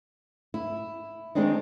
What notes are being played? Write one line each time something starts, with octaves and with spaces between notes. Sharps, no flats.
E4
D#3 G#3 C4 D4 D#4